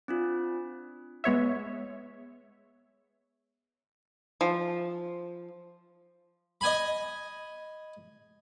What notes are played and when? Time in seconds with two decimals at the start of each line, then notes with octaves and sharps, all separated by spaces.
0.08 C4 D4 F4
1.24 G#3 B3 C#5 E5
4.41 F3
6.61 D#5 G#5 B5